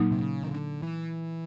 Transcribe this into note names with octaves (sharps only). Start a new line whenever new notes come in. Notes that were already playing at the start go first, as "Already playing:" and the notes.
Already playing: A#2 F#3 A#3 D#4
C3
C#3
D#3
D3
E3